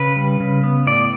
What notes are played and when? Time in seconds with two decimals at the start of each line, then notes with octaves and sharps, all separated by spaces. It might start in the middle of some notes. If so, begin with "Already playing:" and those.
Already playing: C#3 B4
0.16 G3
0.40 C#3
0.63 B3
0.87 A2 D5